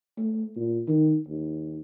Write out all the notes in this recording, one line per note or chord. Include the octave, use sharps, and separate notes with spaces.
A3
A#2
D#3
D#2